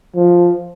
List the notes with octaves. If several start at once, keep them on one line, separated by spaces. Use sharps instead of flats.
F3